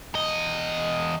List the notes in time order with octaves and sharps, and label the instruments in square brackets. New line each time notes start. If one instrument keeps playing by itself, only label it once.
[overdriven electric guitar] E2 D#5